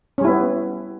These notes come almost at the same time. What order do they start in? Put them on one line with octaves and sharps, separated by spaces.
C#4 G3 E4 B3